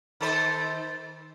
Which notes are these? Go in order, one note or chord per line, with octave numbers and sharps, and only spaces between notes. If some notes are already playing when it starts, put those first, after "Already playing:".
D#3 A4 C5